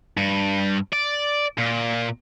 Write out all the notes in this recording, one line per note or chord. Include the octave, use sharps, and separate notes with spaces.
G2
D5
A#2